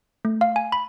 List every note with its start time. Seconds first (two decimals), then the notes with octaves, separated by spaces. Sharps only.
0.25 A3
0.41 F5
0.56 G#5
0.72 B5